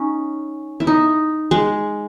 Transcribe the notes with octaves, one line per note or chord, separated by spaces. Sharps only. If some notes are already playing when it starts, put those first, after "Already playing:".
Already playing: C#4 D#4
E4
D#4
G#3